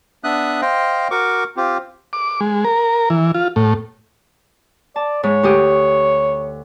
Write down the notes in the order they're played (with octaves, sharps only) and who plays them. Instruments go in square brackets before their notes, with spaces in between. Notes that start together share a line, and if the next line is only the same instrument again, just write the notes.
[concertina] B3 D4 E5 D#6 F#6
C5 D#5 F5 G5
F#4 A#4 C#6 D6
C4 F4 G4
[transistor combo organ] D6
G#3
A#4
E3
F4
A2
[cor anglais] D5 [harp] A5
[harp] G#2 G#3 [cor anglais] C#5
[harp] D2 G4 D#6